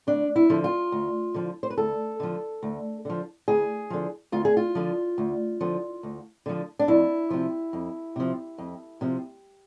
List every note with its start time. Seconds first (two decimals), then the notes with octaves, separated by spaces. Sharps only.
0.07 D2 D4
0.36 E4
0.50 D3 F3
0.64 F4
0.92 D2
1.34 D3 F3
1.63 C5
1.70 B4
1.77 D2 A4
2.20 D3 F3
2.63 D2
3.05 D3 F3
3.48 D2 G#4
3.90 D3 F3
4.32 D2 F4
4.45 G#4
4.57 F4
4.75 D3 F3
5.18 D2
5.61 D3 F3
6.03 D2
6.46 D3 F3
6.79 D4
6.88 F2 E4
7.30 C3 F3
7.73 F2
8.16 C3 F3
8.58 F2
9.01 C3 F3